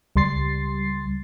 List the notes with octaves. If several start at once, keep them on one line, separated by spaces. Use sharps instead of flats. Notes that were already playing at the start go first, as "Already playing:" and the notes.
C#2 G3 C6 A6 C7